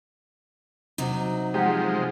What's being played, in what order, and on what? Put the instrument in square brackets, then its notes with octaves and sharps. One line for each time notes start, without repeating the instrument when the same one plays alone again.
[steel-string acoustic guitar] C3 F#3 D#4
[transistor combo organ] F3 G#3 [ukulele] G4 F#5